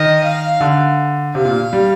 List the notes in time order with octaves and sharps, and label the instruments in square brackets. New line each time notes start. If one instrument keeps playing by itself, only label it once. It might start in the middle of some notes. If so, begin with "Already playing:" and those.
Already playing: [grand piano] D#3 [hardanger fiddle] D#5
[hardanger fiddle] F5
[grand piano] D3
[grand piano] C3 [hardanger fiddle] F5
[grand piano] A#2
G3